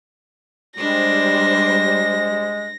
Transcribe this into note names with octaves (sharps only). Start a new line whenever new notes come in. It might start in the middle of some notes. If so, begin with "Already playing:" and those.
G3 G#3 D4 C5 A#6